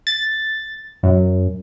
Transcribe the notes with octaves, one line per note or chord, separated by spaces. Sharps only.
A6
F#2